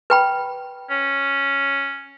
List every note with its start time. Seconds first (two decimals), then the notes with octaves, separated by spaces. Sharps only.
0.10 B4 G5 B5
0.90 C#4